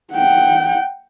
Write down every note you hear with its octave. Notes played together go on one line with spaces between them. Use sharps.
F#5 G5